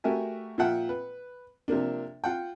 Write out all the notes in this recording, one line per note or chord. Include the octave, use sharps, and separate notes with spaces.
A3 F#4 G4 A#4 E5 G#5
A#2 F3 F4 E5 F#5 G5
B4
C3 F3 A#3 D4
F4 F#5 G5